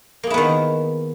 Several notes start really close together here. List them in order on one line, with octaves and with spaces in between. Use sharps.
A#3 G#4 E4 B3 D#3